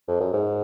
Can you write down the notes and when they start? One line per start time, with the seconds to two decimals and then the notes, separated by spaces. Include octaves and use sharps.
0.08 F2
0.20 F#2
0.33 G#2